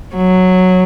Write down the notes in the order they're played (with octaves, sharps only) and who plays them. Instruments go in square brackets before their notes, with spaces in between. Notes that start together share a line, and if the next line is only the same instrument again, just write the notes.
[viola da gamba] F#3